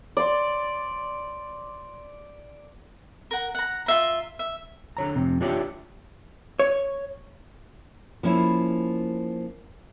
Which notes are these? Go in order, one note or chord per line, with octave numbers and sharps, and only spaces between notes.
D5 C6
A#4 F#5
F#5 A#5
F4 E5 A#5
E5
D3 C#5 A#5
F2 C3
D4 F4 G4 C#5 D5 E5
C#5
F3 A#3 C#4 E4